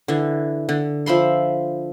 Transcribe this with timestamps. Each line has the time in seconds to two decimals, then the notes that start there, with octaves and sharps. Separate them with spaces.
0.08 D3 E3
0.69 D3
1.06 F3 E5 B5 C6